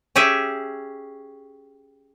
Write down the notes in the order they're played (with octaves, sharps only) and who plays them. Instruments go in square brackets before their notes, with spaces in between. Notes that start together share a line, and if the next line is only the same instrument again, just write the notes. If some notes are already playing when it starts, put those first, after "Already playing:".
[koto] C#4 G4 G#4 E5